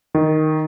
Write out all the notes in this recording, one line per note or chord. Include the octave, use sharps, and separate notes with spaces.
D#3